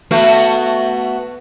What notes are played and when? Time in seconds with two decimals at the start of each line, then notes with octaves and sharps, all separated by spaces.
0.11 A3 B3 F#4